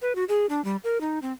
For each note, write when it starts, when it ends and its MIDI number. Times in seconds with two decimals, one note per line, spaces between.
0.02 0.15 71
0.15 0.24 66
0.29 0.46 68
0.49 0.63 62
0.64 0.76 55
0.84 1.00 70
1.01 1.19 63
1.22 1.32 60